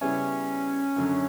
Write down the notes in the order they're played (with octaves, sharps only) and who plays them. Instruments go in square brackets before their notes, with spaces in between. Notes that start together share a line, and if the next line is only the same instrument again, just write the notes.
[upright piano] C#3 G3 B3 E4 [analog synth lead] C#4
[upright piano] F#2 D3 F#3